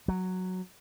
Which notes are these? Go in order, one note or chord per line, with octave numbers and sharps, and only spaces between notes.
F#3